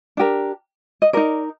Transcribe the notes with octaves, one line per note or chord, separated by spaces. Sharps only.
D4 G4 A#4
D#5
D#4 A#4 D5